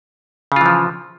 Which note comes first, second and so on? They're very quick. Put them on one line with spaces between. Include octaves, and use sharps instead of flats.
C#3 F4 E3 F3